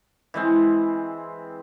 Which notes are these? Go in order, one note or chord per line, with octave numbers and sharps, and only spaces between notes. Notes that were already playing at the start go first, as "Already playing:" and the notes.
E3 G#3 C4